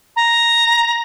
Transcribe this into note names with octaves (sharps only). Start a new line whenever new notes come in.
A#5